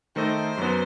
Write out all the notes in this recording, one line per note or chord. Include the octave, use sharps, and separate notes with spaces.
D#3 A3 D#4 A4 C5 D#5
F#2 F#3 B3